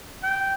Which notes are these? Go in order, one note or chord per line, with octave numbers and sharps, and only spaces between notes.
G5